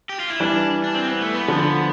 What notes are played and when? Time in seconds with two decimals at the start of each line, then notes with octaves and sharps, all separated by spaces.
0.09 G4
0.20 F4
0.30 E4
0.40 E3 G3 D4
0.84 D4
0.94 C4
1.08 B3
1.21 A3
1.35 B3
1.48 D3 F3